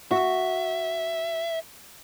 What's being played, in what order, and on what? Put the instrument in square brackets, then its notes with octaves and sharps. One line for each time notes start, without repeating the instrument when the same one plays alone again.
[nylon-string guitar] F#4 [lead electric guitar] E5